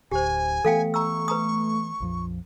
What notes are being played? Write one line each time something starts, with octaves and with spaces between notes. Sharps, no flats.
D1 D2 G4 C5 G#5
E3 A3 B3 A4 F5 G5
A#5 C#6 E6
B4 A#5 D#6
A#1 F2 F3